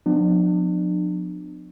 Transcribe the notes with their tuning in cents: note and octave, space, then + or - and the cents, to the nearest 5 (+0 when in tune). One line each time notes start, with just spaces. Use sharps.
F3 +40 B3 +35 D4 +40